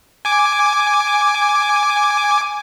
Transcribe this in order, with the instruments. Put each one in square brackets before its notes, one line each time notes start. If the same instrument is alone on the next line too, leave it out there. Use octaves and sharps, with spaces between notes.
[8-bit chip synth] G#5 D6